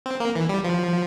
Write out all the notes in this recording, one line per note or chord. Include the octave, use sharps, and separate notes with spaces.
C4
A#3
E3
G3
F3